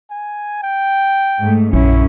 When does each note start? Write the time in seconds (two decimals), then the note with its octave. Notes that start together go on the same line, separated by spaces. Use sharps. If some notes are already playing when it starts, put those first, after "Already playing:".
0.10 G#5
0.63 G5
1.41 G#2 A3
1.73 A#1 F#2 C#4 E4